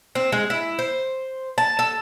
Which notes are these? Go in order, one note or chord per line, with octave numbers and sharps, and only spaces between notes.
C4
G#3
E4
C5
A5
A4